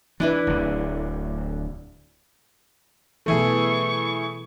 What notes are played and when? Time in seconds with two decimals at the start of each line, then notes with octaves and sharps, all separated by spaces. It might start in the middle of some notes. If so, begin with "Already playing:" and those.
0.20 E3 D4 E4 B4
0.47 D1 D2 D3
3.26 B2 E3 A3 E4 G#4 A4 C#6